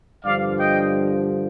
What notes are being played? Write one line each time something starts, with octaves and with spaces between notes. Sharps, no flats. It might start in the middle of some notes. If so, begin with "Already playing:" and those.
G2 D3 F3 D5 F5
D#5 G5